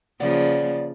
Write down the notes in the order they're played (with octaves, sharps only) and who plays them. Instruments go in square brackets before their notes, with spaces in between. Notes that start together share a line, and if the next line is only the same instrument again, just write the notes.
[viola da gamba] C#3 F3 A#3 [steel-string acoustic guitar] E3 D5 F#5